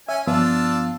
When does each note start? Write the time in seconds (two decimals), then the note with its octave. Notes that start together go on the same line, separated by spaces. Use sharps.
0.09 C#4 E5 G#5
0.27 G2 F3 B3 D4 F4 E6